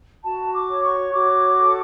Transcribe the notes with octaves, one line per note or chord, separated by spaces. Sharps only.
F#4 A5
D6
C#5
C#6
F#4 D6
A4